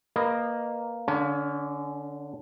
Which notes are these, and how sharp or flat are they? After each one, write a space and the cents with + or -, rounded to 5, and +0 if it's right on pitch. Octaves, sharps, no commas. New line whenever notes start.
A#3 +0 B4 +0 D#5 -20
D3 +0 C#4 +30 F5 +25